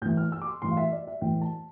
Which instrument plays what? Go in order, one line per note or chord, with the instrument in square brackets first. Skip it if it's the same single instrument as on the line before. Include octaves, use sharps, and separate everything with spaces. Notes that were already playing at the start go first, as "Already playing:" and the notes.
[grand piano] A2 E3 G6
F6
E6
D6
C6
A2 E3 C6
F5
E5
D5
E5
A2 E3 G5
A5